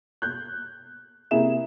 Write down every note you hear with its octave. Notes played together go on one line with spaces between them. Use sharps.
F#6 G6
C3 A#3 E4 G#4 E5 E7